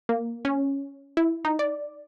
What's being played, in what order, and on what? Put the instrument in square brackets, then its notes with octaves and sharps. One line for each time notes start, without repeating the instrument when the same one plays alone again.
[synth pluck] A#3
C#4
E4
D#4
D5